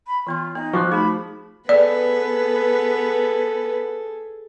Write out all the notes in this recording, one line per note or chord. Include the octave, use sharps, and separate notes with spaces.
B5
E3 B3 F4 C6
B3 D#4
F3 B3 C5 C#6 D6 F#6
A3 D#4 F#4 G#4 B5 D6
B3 G#4 A4 B4 D5